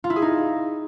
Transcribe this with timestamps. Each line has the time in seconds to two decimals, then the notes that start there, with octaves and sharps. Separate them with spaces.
0.04 F4
0.10 E4
0.16 G#4
0.22 D#4